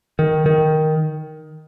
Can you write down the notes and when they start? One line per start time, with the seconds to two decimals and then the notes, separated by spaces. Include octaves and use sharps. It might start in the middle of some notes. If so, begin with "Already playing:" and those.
0.19 D#3
0.46 D#3